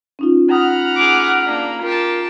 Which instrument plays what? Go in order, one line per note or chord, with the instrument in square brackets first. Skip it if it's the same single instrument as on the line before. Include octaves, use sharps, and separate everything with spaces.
[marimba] C#4 D#4 F4
[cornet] F#5 [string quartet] A#5 B5 F6 [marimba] D#6
[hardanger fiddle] G#4 D6
[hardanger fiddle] A#3 [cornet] D4
[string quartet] F4 [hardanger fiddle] G4 A5 [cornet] A#4